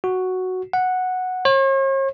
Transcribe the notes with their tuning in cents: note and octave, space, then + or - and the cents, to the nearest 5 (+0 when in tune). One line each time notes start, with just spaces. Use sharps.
F#4 +0
F#5 -5
C#5 -45